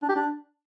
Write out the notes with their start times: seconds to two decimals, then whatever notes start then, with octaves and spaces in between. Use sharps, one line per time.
0.02 D4
0.09 G4
0.15 D4